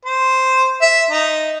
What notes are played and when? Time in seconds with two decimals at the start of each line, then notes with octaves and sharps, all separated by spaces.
0.05 C5
0.82 E5
1.11 D#4